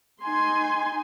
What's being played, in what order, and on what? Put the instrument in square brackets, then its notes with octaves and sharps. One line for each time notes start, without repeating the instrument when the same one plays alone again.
[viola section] D#4 C6 [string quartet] G#5